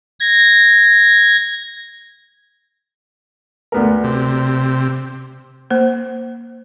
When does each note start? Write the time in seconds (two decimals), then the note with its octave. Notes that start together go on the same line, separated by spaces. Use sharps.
0.20 G#6 A#6
3.72 D2 B3 A#4
4.04 C3
5.70 A#3 C5